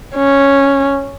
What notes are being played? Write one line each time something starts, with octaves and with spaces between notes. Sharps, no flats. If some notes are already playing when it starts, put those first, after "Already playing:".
C#4